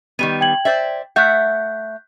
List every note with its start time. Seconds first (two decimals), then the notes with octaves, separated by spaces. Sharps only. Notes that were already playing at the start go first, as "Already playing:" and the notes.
0.19 D#3 G3 B3 D#7
0.41 G5 G#6 F#7
0.65 C5 D5 E5
1.16 A3 E5 F#5 F#6 G6